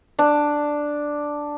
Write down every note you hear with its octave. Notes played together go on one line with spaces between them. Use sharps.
D4